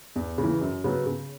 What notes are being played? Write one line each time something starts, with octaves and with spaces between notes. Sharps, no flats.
E2
C#3
E3
F#2
C#3 F#3 B3
C#3